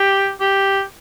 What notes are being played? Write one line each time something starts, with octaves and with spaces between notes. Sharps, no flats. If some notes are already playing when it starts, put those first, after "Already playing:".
Already playing: G4
G4